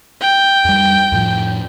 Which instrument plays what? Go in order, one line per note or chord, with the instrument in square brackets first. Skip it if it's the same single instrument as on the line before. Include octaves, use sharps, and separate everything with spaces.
[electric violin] G5
[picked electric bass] F2 G3
F2 A2 F3